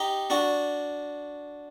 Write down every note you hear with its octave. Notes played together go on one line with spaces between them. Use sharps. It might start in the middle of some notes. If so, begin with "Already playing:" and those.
Already playing: D#4 G4
D4 F#4